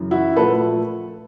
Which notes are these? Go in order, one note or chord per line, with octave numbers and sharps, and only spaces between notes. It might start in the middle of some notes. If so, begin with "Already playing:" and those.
Already playing: F#2 C#3 E3
E4 F#4
A#2 F3 A3 A4 B4